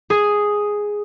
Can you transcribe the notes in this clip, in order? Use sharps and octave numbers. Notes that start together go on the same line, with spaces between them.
G#4